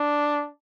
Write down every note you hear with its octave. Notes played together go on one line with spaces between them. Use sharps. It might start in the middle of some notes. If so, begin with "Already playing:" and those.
Already playing: D4